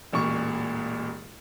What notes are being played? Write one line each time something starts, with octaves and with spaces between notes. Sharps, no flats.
E1 A1 A#2 C#6